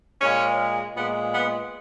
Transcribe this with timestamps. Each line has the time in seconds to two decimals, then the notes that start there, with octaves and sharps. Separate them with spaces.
0.21 A#2 G#3 C#4
0.95 A#2 G#3 B3
1.32 B3